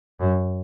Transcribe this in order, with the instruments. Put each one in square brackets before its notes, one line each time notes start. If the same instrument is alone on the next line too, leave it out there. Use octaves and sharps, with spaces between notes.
[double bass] F#2